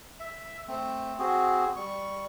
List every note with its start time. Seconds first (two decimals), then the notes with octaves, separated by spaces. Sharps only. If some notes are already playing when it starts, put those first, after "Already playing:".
0.20 E5
0.68 A3 C4
1.19 C4 F#4 G#4
1.76 G3 C#6